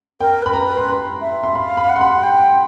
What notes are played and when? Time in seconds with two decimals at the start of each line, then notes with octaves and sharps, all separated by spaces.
0.20 A#4 G5
0.42 B4 B5
0.53 A#5
0.65 B4
0.77 C6
0.88 B5
1.21 E5
1.43 C6
1.55 F5 B5
1.77 B5
1.89 F#5
1.96 C6
2.01 B5
2.23 G5